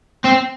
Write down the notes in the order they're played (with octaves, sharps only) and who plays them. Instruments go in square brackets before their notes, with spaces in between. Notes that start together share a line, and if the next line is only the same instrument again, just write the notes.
[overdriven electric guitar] C4